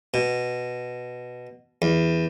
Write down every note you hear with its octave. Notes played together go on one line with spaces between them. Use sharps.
B2
E2